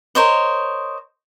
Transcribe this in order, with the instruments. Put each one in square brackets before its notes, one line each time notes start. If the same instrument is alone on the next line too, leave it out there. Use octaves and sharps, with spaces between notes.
[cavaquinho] A#4 C5 C#5 D#5